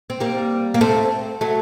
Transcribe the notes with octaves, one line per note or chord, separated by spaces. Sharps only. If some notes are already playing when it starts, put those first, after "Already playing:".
C4
G3 A#3
A#3
A3 C4
F#3 A3